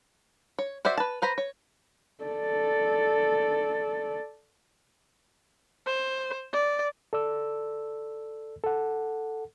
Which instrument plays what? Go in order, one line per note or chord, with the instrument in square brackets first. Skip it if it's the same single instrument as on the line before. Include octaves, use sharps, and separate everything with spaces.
[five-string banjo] C#5
F#4 C5 D5 E5
B4 A5
B4 C5 A#5 B5
C#5
[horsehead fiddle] A4 D5
[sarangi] C5
D5
[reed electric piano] A4 D5 E6
A4 F#5